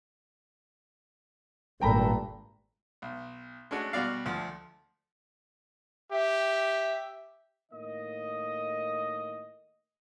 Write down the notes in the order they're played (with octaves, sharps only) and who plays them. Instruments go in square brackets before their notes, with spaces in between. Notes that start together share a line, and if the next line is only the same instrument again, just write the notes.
[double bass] G#1 A#2 [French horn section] G2 A4 [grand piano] G5 A#5 B5
[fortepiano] B1
G#3 A3 C#4 D4 F#4
B2 G3 F#4 D5 F5
D2 F3 A3
[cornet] G4 [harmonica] E5
[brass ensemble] A2 D#3 A#3 D#5